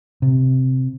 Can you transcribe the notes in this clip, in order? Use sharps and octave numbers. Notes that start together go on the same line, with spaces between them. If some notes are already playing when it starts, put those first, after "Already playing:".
C3